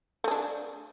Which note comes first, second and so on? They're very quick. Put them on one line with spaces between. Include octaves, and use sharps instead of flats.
A3 G#4 D4